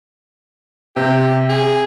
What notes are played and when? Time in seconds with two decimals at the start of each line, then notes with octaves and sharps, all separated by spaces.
0.96 C3 G4
1.49 G#4